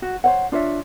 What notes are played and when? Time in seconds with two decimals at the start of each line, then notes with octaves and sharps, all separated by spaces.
0.02 F#4
0.24 C5 C#5 F#5
0.52 D4 F4 C#5 E5